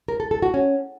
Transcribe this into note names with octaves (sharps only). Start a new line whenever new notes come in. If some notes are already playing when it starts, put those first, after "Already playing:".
A#4
A4
A4
F#4
C#4